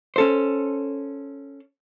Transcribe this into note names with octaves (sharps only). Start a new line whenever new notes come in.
C#4 A4 C5